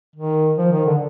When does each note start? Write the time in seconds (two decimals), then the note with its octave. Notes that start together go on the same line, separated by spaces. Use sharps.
0.16 D#3
0.58 F3
0.72 D#3
0.86 D3